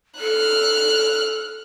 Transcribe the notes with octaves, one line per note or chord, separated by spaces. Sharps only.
A4 F6 F#6